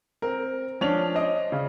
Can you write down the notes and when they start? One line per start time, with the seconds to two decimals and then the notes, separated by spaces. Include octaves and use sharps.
0.22 C4 A#4
0.81 F3 C#4 D4 F7
1.15 C5 D5 D#5 D#6
1.52 C#3